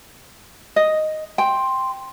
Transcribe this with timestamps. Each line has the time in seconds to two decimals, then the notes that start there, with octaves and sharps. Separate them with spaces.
0.76 D#5
1.38 G5 C6